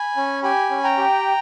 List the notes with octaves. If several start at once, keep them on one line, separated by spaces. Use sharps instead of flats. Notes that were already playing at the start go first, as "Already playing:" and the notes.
Already playing: G#5 B5
C#4
G4 G#5 B5
C#4
G5 A#5
G4